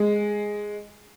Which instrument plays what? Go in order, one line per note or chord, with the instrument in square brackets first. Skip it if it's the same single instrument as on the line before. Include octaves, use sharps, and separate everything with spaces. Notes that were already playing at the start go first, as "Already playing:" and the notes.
Already playing: [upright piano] G#3